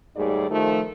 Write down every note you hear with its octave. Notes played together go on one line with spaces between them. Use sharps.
D#2 G#2 G3 A3 G#4 D5
D#3 F3 A3